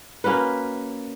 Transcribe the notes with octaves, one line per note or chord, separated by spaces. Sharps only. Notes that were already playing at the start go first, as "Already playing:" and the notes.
A#3 C#4 F#4 B4